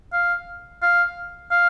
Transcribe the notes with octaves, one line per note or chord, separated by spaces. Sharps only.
F5
F5
F5